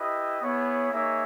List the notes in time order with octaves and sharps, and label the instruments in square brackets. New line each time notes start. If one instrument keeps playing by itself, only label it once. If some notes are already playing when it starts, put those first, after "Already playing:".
Already playing: [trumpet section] E4 G4 B4 D#5
B3 E4 G#4 C#5
A#3 D#4 G#4 C#5 E5